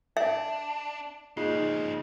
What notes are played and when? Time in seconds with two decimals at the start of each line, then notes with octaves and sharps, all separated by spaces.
0.17 D4 E5
1.37 A#2 C#3 F3 D#4 F4 G#4 C7